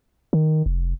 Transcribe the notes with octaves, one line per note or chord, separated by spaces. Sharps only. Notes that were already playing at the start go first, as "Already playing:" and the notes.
D#3
F1